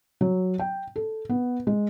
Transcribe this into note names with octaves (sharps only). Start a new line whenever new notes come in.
F#3
G5
A4
B3
G#3